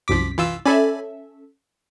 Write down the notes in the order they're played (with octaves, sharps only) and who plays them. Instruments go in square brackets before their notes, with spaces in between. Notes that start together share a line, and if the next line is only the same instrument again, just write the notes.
[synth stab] C2 F#2 B6 [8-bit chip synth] F3 D6
[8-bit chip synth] E3 F4 E6
[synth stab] C#4 A4 E5 [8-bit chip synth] D5 G#5 B5